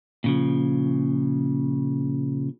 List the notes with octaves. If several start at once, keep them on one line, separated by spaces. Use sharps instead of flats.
A#2 C#3 F3